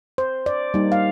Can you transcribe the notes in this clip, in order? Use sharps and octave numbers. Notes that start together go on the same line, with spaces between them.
C5
D5
G3 A#3 D#4
F5